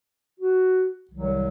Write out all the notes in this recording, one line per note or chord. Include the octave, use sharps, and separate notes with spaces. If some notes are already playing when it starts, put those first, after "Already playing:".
F#4
C2 C3 D#3 F#3